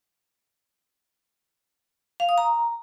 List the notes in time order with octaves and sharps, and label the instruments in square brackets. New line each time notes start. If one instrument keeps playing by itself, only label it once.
[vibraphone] F5
D#6
A#5